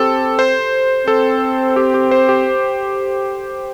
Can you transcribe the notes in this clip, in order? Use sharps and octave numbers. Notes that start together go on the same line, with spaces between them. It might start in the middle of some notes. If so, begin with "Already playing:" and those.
Already playing: C4 G4 A4
C5
C4 A4
G4
G4
C5
G4